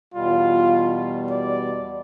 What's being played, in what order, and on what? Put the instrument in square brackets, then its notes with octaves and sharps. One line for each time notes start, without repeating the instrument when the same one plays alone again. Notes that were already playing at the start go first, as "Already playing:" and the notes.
[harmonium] E2 B2 G3 [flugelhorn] F4
[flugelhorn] D5